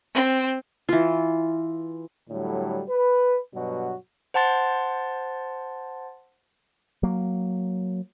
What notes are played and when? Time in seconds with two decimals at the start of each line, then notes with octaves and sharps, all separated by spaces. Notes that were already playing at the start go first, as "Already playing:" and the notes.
0.14 C4
0.89 E3 F4
2.30 A2 D3 F#3 G3
2.89 B4
3.53 G2 B2 F#3 F#4
4.34 C5 F#5 A5 C6 A6
7.03 F#3 A#3